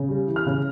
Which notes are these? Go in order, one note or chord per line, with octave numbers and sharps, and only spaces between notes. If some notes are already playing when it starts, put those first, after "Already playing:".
Already playing: C#3
G3
E3
F6
C#3